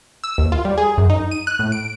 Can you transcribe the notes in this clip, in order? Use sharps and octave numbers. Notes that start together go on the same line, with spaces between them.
E6
D#2
F4
G3
G#4
F#2
D#4
D#7
F#6
A2
D7